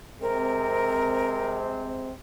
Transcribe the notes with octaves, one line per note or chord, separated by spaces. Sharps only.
C3 G#3 C4 A#4